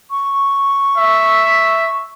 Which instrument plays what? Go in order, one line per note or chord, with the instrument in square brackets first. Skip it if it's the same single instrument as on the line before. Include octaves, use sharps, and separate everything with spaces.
[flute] C#6
[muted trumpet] E5